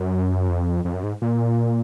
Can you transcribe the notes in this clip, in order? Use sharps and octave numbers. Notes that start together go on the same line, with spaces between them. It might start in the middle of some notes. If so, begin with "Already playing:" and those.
Already playing: F#2
F2
F2
F#2
G#2
A#2